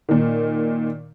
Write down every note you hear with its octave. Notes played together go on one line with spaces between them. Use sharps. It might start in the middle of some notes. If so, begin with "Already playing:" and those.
A#2 D#3